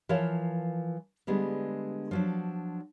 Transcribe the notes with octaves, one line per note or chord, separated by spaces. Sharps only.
E3 F3 A#4 C#5 F5 A5
D3 G3 G#3 B3
F3 F#3 D4